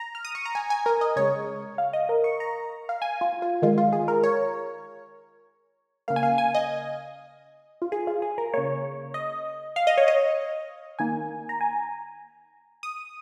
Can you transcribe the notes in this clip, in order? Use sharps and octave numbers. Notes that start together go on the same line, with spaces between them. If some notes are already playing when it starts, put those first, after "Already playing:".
Already playing: A#5
F6
D#6
C#6
A#5
G#5
G#5
A#4
D#5
C#3 G#3 C#5
F5
D#5
A#4
C#6
A#5
F5
G#5
F4
F4
D#3 G#3 F4
F4
G#4
A#4
C#5
C#3 A#3 F5
G#5
F5
G#5
D#5
F4
G#4
F4
G#4
A#4
C#3 A#3 C#5
D#5
F5
D#5
C#5
D#5
D#3 A#3 G#5
A#5
G#5
D#6